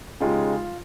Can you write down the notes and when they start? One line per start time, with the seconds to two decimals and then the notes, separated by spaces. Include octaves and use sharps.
0.20 C#3 G#3 D#4 F4 G4